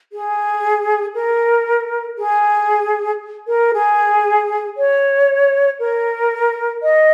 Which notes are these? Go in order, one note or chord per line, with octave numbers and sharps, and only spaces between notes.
G#4
A#4
G#4
A#4
G#4
C#5
A#4
D#5